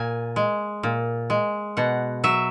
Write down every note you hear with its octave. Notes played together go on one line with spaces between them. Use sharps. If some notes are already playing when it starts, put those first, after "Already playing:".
Already playing: A#2 G#5
G#3
A#2
G#3
B2 F#5
F#3 E5